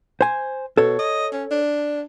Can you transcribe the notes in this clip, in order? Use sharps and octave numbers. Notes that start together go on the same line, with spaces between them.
C5 G#5
B2 A4 C#5
D#5
C#4
D4